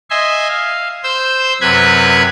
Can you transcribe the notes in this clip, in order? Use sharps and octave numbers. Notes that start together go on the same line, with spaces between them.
D#5 E5 G#5 C6
F5
C5 E6 G6
F#2 C3 B4 B5 F#6 G#6